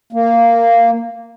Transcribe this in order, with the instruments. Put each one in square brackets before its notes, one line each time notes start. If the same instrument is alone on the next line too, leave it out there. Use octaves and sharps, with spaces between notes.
[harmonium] A#3